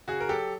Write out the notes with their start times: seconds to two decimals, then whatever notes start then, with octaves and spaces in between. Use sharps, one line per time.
0.08 C#3 F#4 G#4
0.21 A#4
0.29 F#3 G4 A4